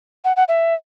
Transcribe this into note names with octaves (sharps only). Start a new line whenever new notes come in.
F#5
F#5
E5